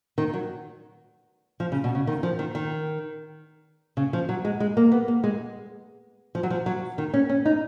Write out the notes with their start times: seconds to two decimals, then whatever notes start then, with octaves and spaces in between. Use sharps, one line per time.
0.18 D#3
0.33 F#3
1.60 F3
1.72 C#3
1.84 B2
1.95 C#3
2.07 D#3
2.23 F3
2.39 D#3
2.55 D#3
3.97 C#3
4.13 F3
4.29 F#3
4.45 G#3
4.60 G#3
4.77 A#3
4.92 B3
5.08 A#3
5.24 G#3
6.35 F3
6.43 F#3
6.51 F3
6.66 F#3
6.98 D#3
7.14 C#4
7.29 C#4
7.46 D#4